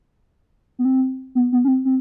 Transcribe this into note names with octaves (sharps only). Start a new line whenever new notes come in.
B3
C4
B3
B3
C#4
C4
C4